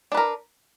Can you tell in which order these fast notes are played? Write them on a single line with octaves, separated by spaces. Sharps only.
D4 B4 A#4